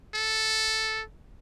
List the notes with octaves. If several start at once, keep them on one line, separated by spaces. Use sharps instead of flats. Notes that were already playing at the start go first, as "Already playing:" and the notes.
A4